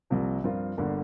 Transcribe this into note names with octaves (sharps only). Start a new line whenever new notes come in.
C2 C3 F3 A#3
G2 F3 C4 F4 A#4
G1 G2 D3 A#3